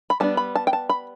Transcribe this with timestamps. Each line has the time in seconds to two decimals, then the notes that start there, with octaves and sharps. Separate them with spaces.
0.10 B5
0.20 G3 B3 D4 A5
0.37 B5
0.56 A5
0.67 G5
0.73 A5
0.89 B5